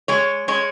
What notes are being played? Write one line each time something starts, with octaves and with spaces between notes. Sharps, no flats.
G#3 C#5
G#3 C#5